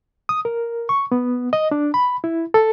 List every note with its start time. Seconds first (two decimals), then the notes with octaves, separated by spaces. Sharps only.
0.29 D#6
0.45 A#4
0.89 C#6
1.12 B3
1.53 D#5
1.71 D4
1.94 B5
2.24 E4
2.54 A4